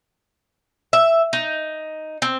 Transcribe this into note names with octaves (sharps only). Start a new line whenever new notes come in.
E5
D#4
C4